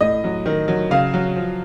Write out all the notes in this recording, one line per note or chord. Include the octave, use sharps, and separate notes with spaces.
A2 D#5
F#3
D#3
F#3
C#3 F5
F#3
F3